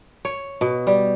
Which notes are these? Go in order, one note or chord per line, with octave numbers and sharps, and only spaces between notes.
C#5
B2
G3